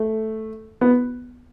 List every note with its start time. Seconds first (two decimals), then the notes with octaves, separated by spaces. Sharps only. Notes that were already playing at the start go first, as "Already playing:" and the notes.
Already playing: A3
0.81 B3